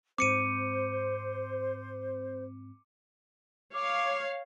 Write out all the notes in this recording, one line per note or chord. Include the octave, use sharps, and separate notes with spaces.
G#2 C4 C5 D6 C#7 D#7
C#5 F5 D6